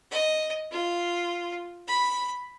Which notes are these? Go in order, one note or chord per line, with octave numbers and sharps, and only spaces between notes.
D#5
F4
B5